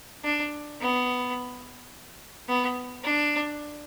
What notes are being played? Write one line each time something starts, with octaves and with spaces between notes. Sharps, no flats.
D4
B3
B3
D4